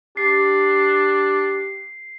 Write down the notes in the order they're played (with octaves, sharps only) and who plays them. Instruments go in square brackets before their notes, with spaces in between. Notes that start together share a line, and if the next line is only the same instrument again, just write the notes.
[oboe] D4 [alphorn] G4 [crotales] C7